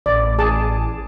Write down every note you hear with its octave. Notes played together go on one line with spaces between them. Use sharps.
A1 D5
G#4 A5 D6